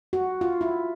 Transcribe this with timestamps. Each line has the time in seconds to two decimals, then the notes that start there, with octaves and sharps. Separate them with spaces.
0.13 F#4
0.41 F4
0.61 E4